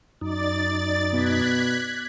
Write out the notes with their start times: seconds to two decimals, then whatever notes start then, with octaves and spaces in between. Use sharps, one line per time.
0.21 F#2 D#4 D5 A6
1.13 B2 F#6 G#6 B6